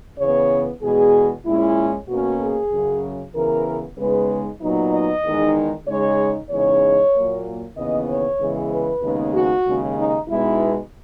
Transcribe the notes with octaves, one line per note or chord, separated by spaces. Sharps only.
C#3 E3 B3 C#5
E2 B2 G#3 G#4
A#2 G#3 C#4 E4
B2 A#3 C#4 F#4
G#4
F#2 C#3 F#3 C#4
C#3 E3 B3 A#4
C#3 G#3 B3 D#4 B4
A#2 F#3 B3 D#4
D#5
E2 D#3 G#3 D#4
C#3 G#3 D#4 C#5
E2 C#3 G#3 D#4 C#5
A#2 F#3 A#3
D#2 C#3 E3 B3 D#5
C#5
C#3 E3 G#3 B3
B4
D#2 C#3 G#3 B3 D#4
F#4
D#2 C#3 G#3
D#4
B2 G#3 B3 D#4 E4